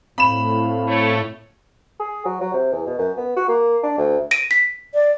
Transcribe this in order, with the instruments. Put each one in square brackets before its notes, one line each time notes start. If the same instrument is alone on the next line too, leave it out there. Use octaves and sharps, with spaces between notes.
[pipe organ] A2 [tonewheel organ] C4 F5 [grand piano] B5 E7
[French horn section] A3 C#5
[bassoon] G#4
F#3
F#3
C3
E2
B2
F#2
B3
F#4
A#3
D4
D2
[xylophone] A#6 D7 D#7
B6
[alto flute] D5